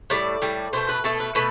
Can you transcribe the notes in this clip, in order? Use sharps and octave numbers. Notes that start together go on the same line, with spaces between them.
A2 G3 D5
A2 G3
B2 A3 C5
B4
B2 A3 A4
B4
B2 A3 B4